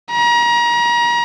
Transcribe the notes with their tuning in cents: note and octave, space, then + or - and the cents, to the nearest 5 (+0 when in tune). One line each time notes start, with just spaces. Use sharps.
A#5 +35